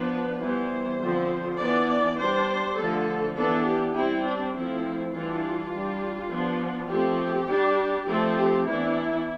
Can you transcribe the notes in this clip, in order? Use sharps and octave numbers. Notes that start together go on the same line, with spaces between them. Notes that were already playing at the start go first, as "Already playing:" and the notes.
Already playing: F3 B3 D4 B4
E3 G3 B3 C5
D3 F3 C4
E3 B3 D4 D5
G3 D4 C5
D3 F3 A3 A4
E3 B3 D4 A4
G4
G3 C4 E4
D4
F3 A3 C4 E4
E3 G3 D4 F4
G3 D4
F3 B3 D4
F3 A3 C4 G4
G3 D4
F3 A3 C4 A4
G4
E3 B3 D4 E4